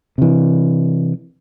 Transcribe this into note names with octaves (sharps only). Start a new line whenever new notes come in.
C3 E3